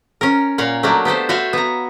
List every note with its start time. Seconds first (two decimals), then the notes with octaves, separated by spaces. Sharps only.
0.21 C#4 A#4
0.58 A#2 C#5 F5 F#5
0.83 F#3 A3 A#3 D4
1.05 B3 G4 A4 C5
1.29 F#4 C5 C#5 E5 F5
1.53 B3 A#5